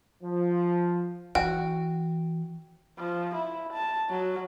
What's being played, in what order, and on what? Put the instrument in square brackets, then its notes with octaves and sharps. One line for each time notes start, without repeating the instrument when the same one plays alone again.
[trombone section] F3
[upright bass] E3 [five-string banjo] F#4 [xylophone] G5
[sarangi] F3
E4
A5
F#3